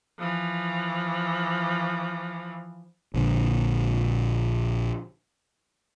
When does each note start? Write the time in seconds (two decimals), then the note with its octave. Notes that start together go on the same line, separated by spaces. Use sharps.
0.19 E3 F3
3.14 A#1 A#2 D3